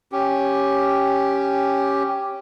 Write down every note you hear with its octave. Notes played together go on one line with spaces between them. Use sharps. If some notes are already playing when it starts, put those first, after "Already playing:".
C#4 G4